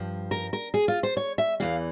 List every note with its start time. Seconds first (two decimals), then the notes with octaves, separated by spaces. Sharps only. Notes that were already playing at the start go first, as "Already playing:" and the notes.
Already playing: G2 F3
0.31 A#4
0.53 A#4
0.74 G#4
0.88 F4
1.03 C5
1.17 C#5
1.38 E5
1.60 E2 E3 F5